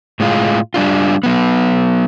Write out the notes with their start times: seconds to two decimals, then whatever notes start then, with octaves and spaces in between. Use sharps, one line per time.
0.20 A2 G#3 F4
0.74 G3 D4 F4
1.23 F#3 B3